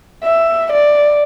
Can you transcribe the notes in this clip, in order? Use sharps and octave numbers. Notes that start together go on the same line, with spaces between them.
E5
D5